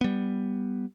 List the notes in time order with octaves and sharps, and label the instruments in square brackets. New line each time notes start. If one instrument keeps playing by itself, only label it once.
[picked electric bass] G3 B3